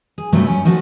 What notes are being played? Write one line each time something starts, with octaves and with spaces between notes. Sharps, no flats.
G#4
G2 C3 F3 F#3 A3
C#4
F3 A3 F#4 A4